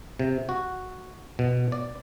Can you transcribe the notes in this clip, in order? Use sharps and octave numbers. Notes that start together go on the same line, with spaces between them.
C3
F#4
B2
D5